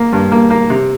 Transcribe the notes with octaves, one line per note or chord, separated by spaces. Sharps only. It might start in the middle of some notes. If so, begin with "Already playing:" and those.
Already playing: A#3
G2
A#3
A#3
C3